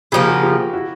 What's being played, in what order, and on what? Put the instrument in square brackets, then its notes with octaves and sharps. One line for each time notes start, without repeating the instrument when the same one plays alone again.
[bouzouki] C#3 F3 A#3 [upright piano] F4 G4
[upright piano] F#4 G#4
F4 G4
E4 F#4